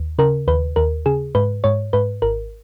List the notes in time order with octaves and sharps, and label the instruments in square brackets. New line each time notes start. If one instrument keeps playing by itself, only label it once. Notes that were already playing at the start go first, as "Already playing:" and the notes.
Already playing: [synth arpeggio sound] D#2
C#3 A#4
D#2 B4
D#2 A#4
C#3 G#4
G#2 B4
G#2 C#5
G#2 B4
G#1 A#4